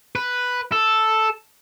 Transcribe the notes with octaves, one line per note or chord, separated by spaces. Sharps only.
B4
A4